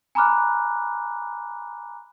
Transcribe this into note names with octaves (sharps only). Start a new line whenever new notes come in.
G#5 A#5 B5 D6 F6 F#6